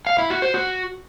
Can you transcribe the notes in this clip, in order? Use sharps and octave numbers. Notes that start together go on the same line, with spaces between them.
F5
E4
F#4
C5
F#4